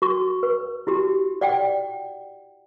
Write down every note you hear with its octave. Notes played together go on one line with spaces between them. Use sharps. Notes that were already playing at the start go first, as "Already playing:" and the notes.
F#4 C#6
B4
E4 F#4 G4
D5 F#5 G5